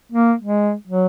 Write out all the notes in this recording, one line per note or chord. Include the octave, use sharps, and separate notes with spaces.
A#3
G#3
F#3